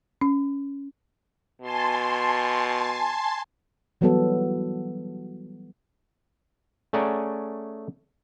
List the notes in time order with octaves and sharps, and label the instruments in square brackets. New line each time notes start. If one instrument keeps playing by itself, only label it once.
[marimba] C#4
[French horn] B2 [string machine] G#5 A5 C6
[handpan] E3 F#3 G3 B3 F#4 A4
[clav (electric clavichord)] A3 C#4 G#4 D5 F#5 A#5